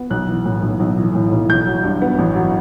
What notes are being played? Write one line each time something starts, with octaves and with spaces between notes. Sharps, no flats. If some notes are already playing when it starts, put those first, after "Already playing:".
Already playing: B3
B1 F#6
E3
A2
B1
B1
E3
A2
B1
A1 G6
F#3
G2
B3
A1
F#3